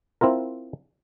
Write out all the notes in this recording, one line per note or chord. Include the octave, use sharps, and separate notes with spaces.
C4 E4 F4 A#4